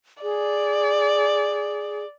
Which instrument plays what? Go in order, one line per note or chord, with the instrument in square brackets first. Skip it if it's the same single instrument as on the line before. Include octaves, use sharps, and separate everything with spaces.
[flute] G#4 [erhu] D5